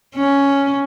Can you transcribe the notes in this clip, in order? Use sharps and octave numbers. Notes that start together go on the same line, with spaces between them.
C#4